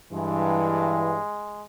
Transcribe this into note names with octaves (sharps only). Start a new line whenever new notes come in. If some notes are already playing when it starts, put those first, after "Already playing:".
G2 E3 G#3